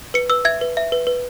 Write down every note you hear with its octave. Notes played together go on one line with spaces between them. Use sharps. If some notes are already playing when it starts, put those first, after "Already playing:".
B4 C#7
B4 E6
E5 G#6
B4
E5
B4
B4